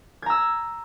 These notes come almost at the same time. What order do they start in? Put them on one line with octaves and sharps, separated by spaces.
G#6 A#5 E6